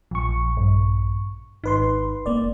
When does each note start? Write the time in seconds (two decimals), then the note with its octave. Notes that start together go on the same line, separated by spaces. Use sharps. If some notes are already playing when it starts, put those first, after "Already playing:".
0.11 A#1 F3 C#6
0.57 G2
1.64 G#1 D#4 B4 C6
2.26 F1 A#3 D5